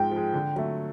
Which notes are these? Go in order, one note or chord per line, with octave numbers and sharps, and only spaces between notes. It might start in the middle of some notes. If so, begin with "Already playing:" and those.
Already playing: G#2 F3 G#3 G5
F3 G#3
D3
F#3 A3